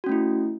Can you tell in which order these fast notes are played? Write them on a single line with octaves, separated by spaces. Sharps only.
F#4 C#4 A3 E4